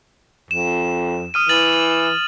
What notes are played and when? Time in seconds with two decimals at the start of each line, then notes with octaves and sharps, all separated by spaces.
0.51 F2 E7
1.34 D#6 F6 D#7
1.49 E3 A6 F#7